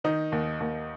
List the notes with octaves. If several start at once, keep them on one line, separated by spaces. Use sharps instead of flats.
D#3 D#4
D#2
D#2